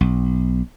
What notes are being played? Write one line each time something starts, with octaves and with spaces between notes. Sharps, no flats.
B1